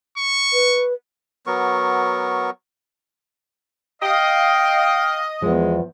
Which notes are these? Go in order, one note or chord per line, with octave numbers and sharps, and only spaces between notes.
C#6
B4
F#3 B3 A#4 C#6
D#5 F5 G5
E2 F3 G#3